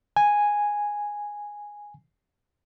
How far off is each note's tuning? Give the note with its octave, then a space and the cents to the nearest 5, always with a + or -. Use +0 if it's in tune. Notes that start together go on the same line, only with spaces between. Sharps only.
G#5 -5